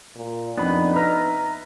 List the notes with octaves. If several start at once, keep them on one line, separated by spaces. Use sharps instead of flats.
A#2
F2 B3 D4 D#4 B5
B4 E5 A#5 F6 A#6